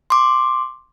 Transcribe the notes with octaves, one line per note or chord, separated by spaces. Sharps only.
C6 D6